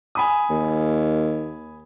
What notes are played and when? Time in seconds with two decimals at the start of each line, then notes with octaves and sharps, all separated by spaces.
0.15 G#5 B5 D#6
0.50 D#2